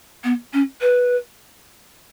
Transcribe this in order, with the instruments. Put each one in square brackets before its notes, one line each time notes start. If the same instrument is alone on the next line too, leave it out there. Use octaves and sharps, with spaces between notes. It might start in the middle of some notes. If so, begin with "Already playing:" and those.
[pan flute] B3
C#4
B4